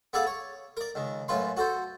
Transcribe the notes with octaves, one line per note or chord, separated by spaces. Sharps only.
B3 G#4 A4 D5 E5 F5
C#5
A#4 D5
C#2 D#3
F#2 A2 F4 B4 C6
F#4 A4 C5